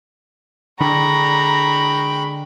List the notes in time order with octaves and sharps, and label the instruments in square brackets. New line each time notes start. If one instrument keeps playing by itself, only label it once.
[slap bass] D3 D4 [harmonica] G#3 G5 C#6 [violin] A#5 [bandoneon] B5